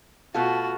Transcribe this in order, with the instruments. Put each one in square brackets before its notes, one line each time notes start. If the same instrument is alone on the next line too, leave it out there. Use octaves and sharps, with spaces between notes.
[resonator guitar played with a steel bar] B2 A3 F4 A4 [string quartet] F#4